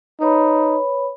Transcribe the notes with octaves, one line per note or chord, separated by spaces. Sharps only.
D#4 B4 C#5 B5